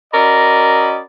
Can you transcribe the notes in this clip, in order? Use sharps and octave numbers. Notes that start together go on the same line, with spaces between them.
C#4 F#4 A#4 D5 D#5 B5